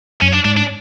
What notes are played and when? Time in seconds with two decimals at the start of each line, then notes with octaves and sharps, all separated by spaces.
0.21 F#2 C#4
0.33 D4
0.45 G#2 D4
0.57 D4